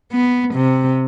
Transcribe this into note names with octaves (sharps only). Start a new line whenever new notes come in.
B3
C3